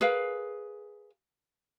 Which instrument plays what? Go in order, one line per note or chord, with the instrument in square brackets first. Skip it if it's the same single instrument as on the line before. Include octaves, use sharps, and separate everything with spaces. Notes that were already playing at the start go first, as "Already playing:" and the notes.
[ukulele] G#4 A#4 B4 F5